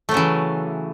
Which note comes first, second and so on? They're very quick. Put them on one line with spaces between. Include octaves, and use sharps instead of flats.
A3 F#3 C#3 E3